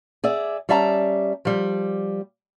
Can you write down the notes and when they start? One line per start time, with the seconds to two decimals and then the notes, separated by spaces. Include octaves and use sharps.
0.24 G#4 D5 E5
0.69 G3 C#4 D5 E5 A5 A#5
1.45 F3 G3